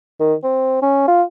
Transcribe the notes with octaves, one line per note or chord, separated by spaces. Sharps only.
D#3
C4
C#4
F4